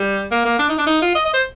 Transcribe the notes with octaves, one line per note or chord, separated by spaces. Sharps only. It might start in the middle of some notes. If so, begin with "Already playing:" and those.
Already playing: G3
A#3
A#3
D4
D#4
D4
D#4
F4
D#5
D#5
C5